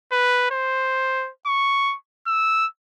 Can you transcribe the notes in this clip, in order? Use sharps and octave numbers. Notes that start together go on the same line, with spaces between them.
B4
C5
C#6
E6